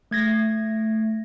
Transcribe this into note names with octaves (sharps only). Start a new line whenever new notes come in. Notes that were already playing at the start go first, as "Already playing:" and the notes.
A3 G#6 A#6